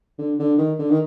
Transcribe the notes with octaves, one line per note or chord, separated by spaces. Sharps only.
D3
D3
D#3
D3
D#3